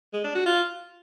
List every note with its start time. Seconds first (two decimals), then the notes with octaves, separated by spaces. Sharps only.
0.13 G#3
0.24 D4
0.35 F#4
0.46 F4